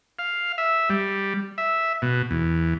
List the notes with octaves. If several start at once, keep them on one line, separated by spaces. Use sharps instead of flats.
F5
E5
G3
E5
B2
E2